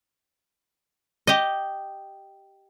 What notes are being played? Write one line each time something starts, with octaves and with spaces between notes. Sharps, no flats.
G4 D#5